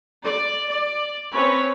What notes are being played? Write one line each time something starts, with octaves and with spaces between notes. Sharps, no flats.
D5
D5
C4 C#4 B4 C#5